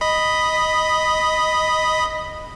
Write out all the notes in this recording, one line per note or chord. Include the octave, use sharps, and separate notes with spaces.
D#5 B5